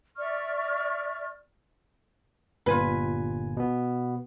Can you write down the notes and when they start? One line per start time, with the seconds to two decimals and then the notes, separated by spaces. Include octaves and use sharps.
0.17 D5 E5 C#6 F6
2.66 G1 A#2 F4 B4 G#5
3.57 B2 B3